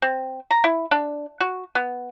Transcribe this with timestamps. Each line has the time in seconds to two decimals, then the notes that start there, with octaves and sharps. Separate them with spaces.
0.02 C4
0.51 A#5
0.64 E4
0.91 D4
1.40 F#4
1.75 B3